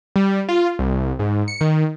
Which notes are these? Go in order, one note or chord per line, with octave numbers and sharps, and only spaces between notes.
G3
F4
C2
G#2
C#7
D#3